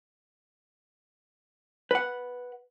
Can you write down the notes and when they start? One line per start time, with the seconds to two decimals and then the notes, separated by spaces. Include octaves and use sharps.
1.91 B4 F#5